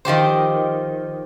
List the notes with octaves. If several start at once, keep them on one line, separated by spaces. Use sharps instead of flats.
D#3 F3 G4 C5